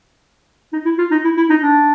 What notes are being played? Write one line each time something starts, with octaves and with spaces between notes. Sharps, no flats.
D#4
E4
F4
D#4
E4
E4
D#4
D4